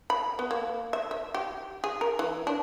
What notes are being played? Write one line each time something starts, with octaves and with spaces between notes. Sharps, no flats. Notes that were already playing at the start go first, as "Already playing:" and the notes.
B5
B3
A#3
E5
E5
G4
G#4
A#4
E3
D4